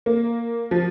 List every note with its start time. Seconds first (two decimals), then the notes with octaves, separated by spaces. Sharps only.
0.06 A#3
0.71 F3